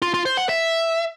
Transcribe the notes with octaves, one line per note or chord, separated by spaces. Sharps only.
F4
F4
C5
F#5
E5